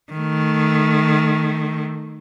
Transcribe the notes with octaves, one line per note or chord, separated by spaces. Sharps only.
D#3 A3